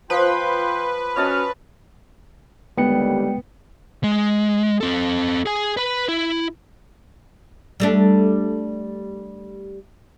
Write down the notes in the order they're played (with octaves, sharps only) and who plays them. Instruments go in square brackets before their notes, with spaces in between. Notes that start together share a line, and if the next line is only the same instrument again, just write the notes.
[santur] F3 [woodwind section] F4 G5 C6 [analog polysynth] B4
[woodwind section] C#4 F#4 F6 [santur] C#5 D#5 A5
[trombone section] D#2 D3 G3 [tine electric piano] G#3 G5 C#7 [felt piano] B3
[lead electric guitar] G#3
C4 A4
G#4 G#5
B4 B5
E4
[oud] G3 A3 D4